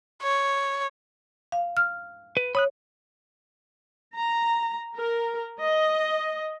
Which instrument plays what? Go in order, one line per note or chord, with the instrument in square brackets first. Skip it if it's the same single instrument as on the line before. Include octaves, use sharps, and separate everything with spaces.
[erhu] C#5
[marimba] F5
F6
[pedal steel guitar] B4
[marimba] C#5 [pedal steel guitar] B5 D#6 F#6
[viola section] A#5
A#4
D#5